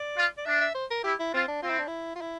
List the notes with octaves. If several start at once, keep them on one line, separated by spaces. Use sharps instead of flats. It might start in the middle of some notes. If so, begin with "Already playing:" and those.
Already playing: D5
F4
D5
D4 E5
E5
C5
A#4
E4 G4
E4
C4 F4
D4
C4 F4
E4
D4
E4
F4
E4